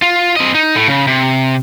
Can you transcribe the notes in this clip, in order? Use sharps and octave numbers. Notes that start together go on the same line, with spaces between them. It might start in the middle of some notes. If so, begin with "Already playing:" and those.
F4
C4 D#5
D#4
A2 A3
C#3
C3